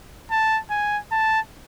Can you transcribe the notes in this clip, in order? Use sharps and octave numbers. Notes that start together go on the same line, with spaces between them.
A5
G#5
A5